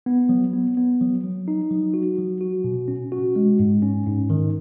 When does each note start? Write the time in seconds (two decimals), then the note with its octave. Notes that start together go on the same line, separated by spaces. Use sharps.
0.06 B3
0.29 F#3
0.53 B3
0.77 B3
1.01 F#3
1.24 F#3
1.48 D#4
1.71 F#3
1.94 F#4
2.18 F#3
2.41 F#4
2.64 B2
2.88 C#4
3.12 F#4
3.36 G#3
3.59 G#2
3.83 C#4
4.06 G#2
4.30 D#3